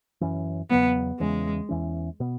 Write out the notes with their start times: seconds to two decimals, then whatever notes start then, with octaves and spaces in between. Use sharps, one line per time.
0.21 F#2 E3 C#4
0.70 E2 C#3 F#3 B3
1.20 E2 C#3 E3 G#3 C#4
1.69 E2 E3 C#4
2.20 B2 B3